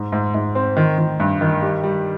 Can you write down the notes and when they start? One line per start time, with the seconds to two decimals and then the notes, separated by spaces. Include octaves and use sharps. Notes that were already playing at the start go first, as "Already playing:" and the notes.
Already playing: G#2
0.12 G#2
0.34 G#2
0.55 C4
0.77 D#3
0.98 D#3
1.20 G2
1.41 D#3
1.62 G3
1.84 G3